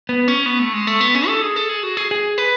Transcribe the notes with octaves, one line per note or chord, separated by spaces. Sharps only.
B3
C#4
B3
A3
G#3
A3
B3
C#4
A4
G#4
A4
G#4
F#4
G#4
G#4
B4